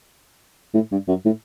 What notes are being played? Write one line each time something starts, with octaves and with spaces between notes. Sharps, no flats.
A2
G2
F#2
A2